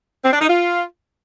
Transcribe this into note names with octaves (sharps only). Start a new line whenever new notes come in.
C4
D4
D#4
F4